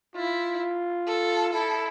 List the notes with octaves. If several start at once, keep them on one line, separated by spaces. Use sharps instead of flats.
E4 F4
A4
E4 A4